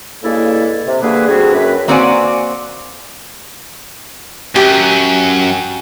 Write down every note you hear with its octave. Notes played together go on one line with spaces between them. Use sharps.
G2 C#3 G#3 A#3 E4 A4
C3
D3 E3 G3 A#3 G#4 B4
D3 G3 C4 D4 F#4 G#4
F#2 B4
A#3 C4 F#4 D5 F#5 G#5
F#2 G4